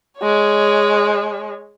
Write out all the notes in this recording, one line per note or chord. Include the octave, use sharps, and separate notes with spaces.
G#3 C#5